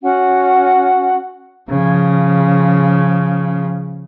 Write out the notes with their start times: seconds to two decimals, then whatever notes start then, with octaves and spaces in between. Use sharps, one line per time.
0.03 C#4 F#4 F#5
1.71 C#3 F3